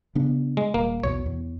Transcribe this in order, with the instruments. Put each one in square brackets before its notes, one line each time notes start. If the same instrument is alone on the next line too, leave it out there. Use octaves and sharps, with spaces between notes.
[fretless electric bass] C#3 B3 D4
[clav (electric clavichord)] G#3
[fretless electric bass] D#1 [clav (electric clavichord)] A#3
[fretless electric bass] B1 E2 B2 [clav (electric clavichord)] C#5
[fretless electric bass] E2